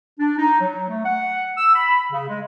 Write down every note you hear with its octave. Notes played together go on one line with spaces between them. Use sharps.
D4
D#4
F#3
A3
F#5
E6
B5
C#3
G#3